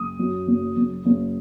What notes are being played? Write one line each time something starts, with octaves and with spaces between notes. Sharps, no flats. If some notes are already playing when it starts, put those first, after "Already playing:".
Already playing: F#1 D#6
F#2
F#1
F#1
F#1